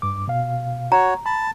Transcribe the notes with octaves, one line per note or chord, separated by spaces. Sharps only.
G2 D6
B2 F5
F#4 C#5 A#5
A5 B5